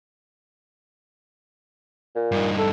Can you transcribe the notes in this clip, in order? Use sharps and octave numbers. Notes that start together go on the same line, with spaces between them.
A#2
G2 D#4
A4